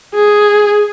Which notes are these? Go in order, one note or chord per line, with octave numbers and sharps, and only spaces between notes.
G#4